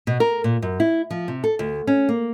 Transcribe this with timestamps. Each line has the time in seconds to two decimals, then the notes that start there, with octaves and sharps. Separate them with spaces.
0.07 B2
0.20 A#4
0.44 A#2
0.62 F#2
0.80 E4
1.10 F3
1.28 C3
1.44 A4
1.59 D2
1.87 C#4
2.09 A#3